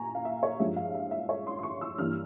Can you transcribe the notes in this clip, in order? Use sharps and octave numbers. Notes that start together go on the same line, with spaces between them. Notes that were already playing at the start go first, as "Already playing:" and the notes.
Already playing: A#2 G#5 A#5 C#6
F5
E5
C#5
G2 F3 G#3 E5
F5
E5
E5
C#5
C6
C6
C#6
E6
G2 E3 G3 A#3 F6